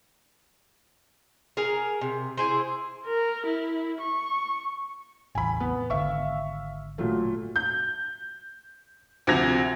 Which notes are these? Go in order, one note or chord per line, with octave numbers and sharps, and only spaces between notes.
G#4 A#4
C3
E4 G#4 C5
A#4
E4
C#6
A1 E2 G#5 B5
B3
G#1 D3 E5 F5 C#6
A#2 F#3 A3
G6
D2 C3 F3 G#6 A#6 F7